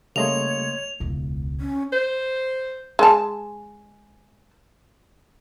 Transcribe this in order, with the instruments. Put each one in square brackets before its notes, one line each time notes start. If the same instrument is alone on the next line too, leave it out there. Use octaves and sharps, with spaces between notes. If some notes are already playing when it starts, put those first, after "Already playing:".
[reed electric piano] C#3 G3 A3 [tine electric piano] A#3 D#5 C6 [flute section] C#5 [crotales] F7
[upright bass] E1 C#2
[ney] C#4
[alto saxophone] C5
[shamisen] G#3 A5